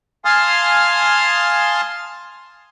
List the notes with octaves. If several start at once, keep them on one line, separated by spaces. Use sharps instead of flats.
F5 G#5 A5 C6 D#6 F6